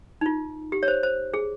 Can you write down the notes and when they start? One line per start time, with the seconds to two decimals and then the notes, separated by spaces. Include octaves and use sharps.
0.21 D#4
0.26 F4
0.72 G4
0.83 C#5
0.88 C5
1.03 C5
1.34 G#4